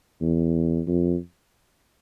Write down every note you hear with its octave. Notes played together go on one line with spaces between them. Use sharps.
E2
F2